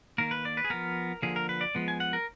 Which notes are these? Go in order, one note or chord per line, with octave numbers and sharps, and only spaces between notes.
D#3 A#3 A#4
B4
D5
B4
G#4
F3 B3 A#4
D3 F3 A#3 G#4
A#4
B4
D5
F3 G#3 B3
G#5
F#5
A#4